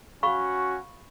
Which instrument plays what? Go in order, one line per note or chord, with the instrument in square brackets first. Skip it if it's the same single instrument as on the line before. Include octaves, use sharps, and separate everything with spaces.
[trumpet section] C#4 F#4 [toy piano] F5 B5 C#6